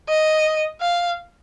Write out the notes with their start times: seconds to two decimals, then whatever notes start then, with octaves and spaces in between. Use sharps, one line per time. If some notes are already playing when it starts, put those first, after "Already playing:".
0.09 D#5
0.81 F5